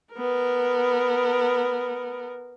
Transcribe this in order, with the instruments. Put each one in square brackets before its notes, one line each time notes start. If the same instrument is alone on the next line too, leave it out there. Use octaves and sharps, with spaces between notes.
[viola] B3 A#4